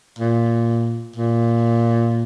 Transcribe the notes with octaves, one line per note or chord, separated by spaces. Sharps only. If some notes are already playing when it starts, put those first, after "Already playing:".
A#2
A#2